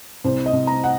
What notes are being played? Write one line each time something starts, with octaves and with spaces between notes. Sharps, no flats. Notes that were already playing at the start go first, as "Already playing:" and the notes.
C2 C5
D#5
C2
A#5
F#5